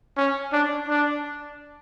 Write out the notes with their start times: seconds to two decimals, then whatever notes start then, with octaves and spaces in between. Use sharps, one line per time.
0.17 C#4
0.53 D4
0.88 D4